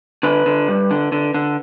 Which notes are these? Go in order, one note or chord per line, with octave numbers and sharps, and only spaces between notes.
D3 B4
D3
G2
D3
D3
D3